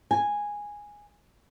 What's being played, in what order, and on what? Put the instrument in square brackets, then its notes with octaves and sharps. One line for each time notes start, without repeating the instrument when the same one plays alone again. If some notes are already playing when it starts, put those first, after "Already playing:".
[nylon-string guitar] G#5